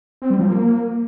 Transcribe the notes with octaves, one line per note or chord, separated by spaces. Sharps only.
C4
G3
F3
A#3